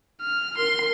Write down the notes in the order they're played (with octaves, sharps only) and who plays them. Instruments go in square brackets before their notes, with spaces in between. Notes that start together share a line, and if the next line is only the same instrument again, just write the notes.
[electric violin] F6
[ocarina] A#4 [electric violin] C6